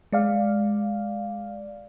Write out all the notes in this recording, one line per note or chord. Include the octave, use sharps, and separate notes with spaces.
G#3 D5 F5